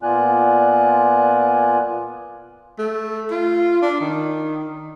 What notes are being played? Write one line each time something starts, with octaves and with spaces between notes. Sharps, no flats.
A#2 B3 F4 D5 G#5 F#6
A3
F4
D4
D#3